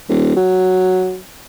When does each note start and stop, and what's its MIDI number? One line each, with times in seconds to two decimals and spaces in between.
0.09 0.35 27
0.36 1.17 54